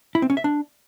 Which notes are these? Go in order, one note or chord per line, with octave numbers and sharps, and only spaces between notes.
E4
C4
C#4
E5
D4